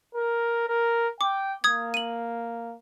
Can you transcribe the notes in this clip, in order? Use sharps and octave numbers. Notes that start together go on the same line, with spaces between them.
A#4
A#4
G5 D6
A#3 D#6 G#6
D#7 F#7